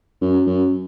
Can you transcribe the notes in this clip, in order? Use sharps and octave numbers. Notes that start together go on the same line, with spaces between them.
F#2
F#2